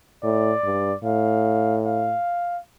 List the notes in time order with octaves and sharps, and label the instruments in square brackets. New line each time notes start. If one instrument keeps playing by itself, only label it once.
[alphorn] A2 [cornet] D5
[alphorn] G2
[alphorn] A2 [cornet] F5
[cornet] F5